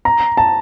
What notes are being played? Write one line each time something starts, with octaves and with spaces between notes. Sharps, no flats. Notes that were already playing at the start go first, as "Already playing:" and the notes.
A#5
A5